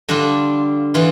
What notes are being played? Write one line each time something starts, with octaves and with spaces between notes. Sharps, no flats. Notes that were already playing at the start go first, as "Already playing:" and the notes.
D3 G3 D4 F4
E3 B3 F4